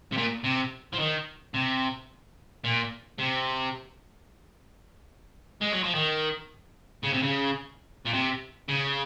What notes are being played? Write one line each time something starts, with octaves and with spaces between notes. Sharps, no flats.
C3
A#2
C3
F3
D#3
C3
A#2
C3
G#3
F#3
F3
D#3
C#3
C3
C#3
A#2
C3
C#3